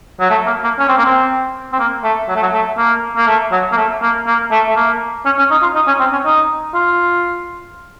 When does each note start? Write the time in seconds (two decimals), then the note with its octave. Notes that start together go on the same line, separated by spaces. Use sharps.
0.20 F#3
0.30 A3
0.46 A#3
0.63 A#3
0.79 C#4
0.88 C4
0.97 A#3
1.05 C4
1.73 C4
1.79 A#3
2.03 A3
2.28 F#3
2.35 A3
2.42 F#3
2.52 A3
2.77 A#3
3.16 A#3
3.27 A3
3.52 F#3
3.72 A#3
3.77 A3
4.02 A#3
4.27 A#3
4.51 A3
4.68 A3
4.76 A#3
5.25 C#4
5.38 C#4
5.50 D#4
5.62 F4
5.75 D#4
5.87 C#4
5.99 C4
6.12 C#4
6.25 D#4
6.74 F4